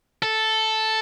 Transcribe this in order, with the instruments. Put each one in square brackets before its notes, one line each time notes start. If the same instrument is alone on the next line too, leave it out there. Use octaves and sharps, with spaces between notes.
[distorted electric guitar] A4